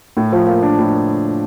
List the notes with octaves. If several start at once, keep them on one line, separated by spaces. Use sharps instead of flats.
A2
F3
A#3
D4
A2